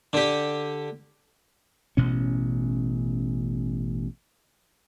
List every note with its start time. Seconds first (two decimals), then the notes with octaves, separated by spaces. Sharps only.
0.13 D3 G4
1.97 A1 B2 C#4